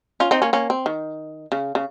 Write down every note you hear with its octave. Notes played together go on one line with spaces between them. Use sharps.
C#4 F4
C4 D#4
A#3 C#4
A#3 C#4
C4
D#3
C#3
C#3